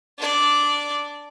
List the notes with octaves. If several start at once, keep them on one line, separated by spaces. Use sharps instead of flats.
D4 D5